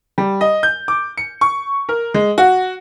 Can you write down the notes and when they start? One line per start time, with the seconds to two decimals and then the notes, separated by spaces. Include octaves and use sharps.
0.18 G3
0.41 D#5
0.63 G6
0.88 D6
1.17 C#7
1.41 C#6
1.89 A#4
2.14 G#3
2.38 F#4